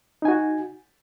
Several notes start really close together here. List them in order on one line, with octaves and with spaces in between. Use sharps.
D#4 G#5 F#4